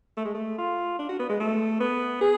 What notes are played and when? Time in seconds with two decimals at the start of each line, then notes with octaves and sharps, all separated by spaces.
0.17 A3
0.25 G#3
0.34 A3
0.58 F4
0.99 D4
1.09 F#4
1.20 B3
1.30 G#3
1.40 A3
1.80 B3
2.21 G#4